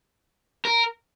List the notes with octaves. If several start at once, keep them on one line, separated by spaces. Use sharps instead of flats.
A#4